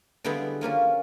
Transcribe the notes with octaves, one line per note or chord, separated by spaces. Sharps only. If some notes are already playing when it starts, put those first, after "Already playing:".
D3 G3 G#3 B3 E4
F3 A#3 C#4 F4